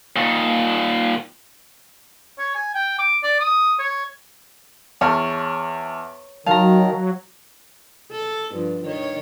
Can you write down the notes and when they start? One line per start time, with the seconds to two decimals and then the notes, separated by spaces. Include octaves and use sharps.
0.16 A#2 D#3
2.39 C#5
2.55 G#5
2.75 G5
2.99 D6
3.23 D5
3.40 D#6
3.79 C#5
5.01 E2 C#5 A5 F6
6.46 D#3 F#3 F5 A5 A#5
8.12 A4
8.52 G2 F3
8.85 D#3 C#5